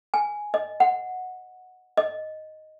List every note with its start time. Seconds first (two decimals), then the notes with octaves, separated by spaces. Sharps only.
0.14 G#5
0.54 D#5
0.80 F#5
1.97 D#5